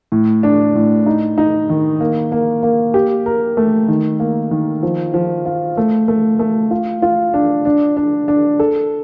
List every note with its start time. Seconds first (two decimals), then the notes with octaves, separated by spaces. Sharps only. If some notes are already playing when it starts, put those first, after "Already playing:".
0.12 A2
0.43 D4
0.75 A2
1.06 D#4
1.38 D#4
1.69 D#3
2.00 A#3
2.32 A#3
2.63 A#3
2.94 G4
3.26 A#4
3.57 A3
3.88 D#3
4.20 A#3
4.51 D#3
4.83 F3
5.14 F3
5.46 F4
5.77 A3
6.08 A3
6.39 A3
6.71 F4
7.02 F4
7.34 D4
7.65 D4
7.97 D4
8.28 D4
8.59 A4